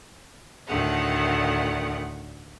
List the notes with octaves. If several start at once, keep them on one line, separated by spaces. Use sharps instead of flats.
D2 A2 D#3 A3 F#5